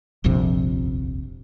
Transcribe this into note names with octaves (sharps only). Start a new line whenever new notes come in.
D#1 A#1 F2 C3